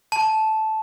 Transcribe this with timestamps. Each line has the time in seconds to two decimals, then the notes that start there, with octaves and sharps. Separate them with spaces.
0.12 A5